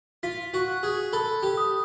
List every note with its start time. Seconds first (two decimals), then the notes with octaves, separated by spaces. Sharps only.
0.23 F4 B6
0.54 F#4
0.68 F#6
0.83 G#4
1.13 A4 B5
1.43 G4
1.58 D#6